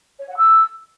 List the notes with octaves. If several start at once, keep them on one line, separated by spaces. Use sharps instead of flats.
C#5
F#5
E6